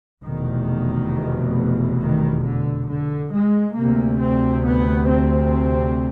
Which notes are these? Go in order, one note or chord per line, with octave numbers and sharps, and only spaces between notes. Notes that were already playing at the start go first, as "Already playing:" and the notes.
F1 E2 B2 D#3
D#3
D3
D3
G#3
D2 C3 A#3
C4
B3
C4